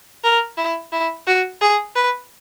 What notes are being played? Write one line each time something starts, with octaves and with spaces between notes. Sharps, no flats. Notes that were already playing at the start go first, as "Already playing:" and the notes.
A#4
E4
E4
F#4
G#4
B4